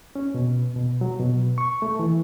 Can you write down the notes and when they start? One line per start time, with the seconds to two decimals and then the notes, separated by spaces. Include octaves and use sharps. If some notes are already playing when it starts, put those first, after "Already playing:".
0.16 C#4
0.35 B2
0.76 B2
1.01 F#3
1.20 B2
1.58 C#6
1.82 A3
1.99 E3